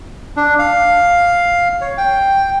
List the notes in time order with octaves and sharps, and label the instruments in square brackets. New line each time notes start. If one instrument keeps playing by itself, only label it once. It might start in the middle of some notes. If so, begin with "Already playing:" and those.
[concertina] D4
F5
C#5
G5